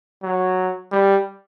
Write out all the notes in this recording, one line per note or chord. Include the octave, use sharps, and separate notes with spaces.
F#3
G3